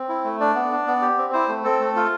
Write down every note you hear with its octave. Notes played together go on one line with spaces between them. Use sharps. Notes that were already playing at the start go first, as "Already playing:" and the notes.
Already playing: C4
E4
A3
D4 D5
B3
D4
B3
G4
C4
E4 C5
A3
C4 A4
A3
F4